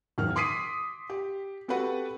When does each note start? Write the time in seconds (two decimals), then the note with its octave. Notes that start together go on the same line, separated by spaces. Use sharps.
0.18 E1 D#3 F#3 F6
0.36 C6 D6 D#6 B6 C7 D#7
1.10 G4
1.68 C4 F#4 G4 A4 B4 F#5